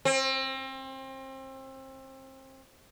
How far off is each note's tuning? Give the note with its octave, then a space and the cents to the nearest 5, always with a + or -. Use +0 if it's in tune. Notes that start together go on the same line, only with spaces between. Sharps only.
C4 +30